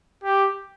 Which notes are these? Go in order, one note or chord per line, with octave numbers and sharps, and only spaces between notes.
G4